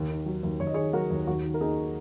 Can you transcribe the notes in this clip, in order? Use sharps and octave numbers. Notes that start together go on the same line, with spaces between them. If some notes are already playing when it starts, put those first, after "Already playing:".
Already playing: D#2
D#3
F#3
D#2
D#2 C#5
D#5
D#3 G#4 C#5
F#3 F#4 A#4
D#2
D#2 F#4
D#3
A#4
A#3 D#4 G#4